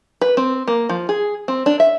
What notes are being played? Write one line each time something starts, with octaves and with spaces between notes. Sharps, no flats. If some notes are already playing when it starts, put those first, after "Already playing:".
B4
C4
A#3
F3
G#4
C4
D4
E5